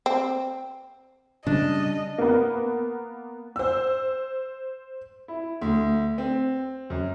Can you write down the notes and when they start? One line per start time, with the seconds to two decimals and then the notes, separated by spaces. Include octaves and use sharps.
0.06 C4
1.47 C#3 G3 D4 D#5
2.18 A#3 B3
3.56 C5 E6
5.28 E4
5.62 D2
6.18 C4
6.90 F#2